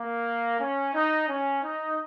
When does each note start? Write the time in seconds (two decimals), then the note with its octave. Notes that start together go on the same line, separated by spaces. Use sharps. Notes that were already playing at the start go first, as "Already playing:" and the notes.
Already playing: A#3
0.60 C#4
0.94 D#4
1.28 C#4
1.63 D#4